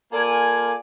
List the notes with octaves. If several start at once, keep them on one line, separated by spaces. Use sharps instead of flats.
A#3 F4 A4 D5 G#5